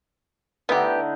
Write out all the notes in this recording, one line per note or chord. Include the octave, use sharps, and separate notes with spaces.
D3 B3 D#4 E4 G4